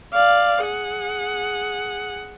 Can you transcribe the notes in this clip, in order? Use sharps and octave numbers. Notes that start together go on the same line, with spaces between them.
D5 F5
G#4 F#5